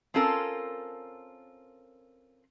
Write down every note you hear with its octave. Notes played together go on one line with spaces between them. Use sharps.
C4 C#4 F4 A4 A#4